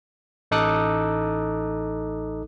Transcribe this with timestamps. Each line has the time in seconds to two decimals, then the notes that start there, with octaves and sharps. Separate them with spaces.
0.51 A1 D#4 A4 D6 D#6 F#6